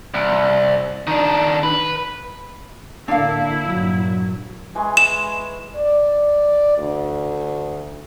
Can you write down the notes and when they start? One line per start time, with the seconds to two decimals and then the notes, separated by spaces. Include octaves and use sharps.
0.14 C2
1.07 D#3 D4
1.63 B4
3.08 A2 D3 A#3 D4 E4 F5
3.67 G2 A#2 F#3
4.75 E3 G#3 C#5
4.97 E7
5.76 D5
6.78 D2